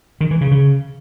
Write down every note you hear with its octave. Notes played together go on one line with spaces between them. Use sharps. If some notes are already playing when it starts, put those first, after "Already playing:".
D#3
E3
C#3
C#3